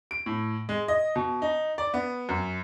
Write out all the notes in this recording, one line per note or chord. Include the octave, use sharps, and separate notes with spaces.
D7
A2
G#3
D#5
B2
D#4
D5
B3
F#2